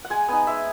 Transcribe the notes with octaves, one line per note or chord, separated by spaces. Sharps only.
F#5
G#3 G#5
B3 D#4 G#5
G#3 E5